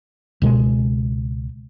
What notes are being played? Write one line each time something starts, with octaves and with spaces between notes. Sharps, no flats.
C#2 B2 G#3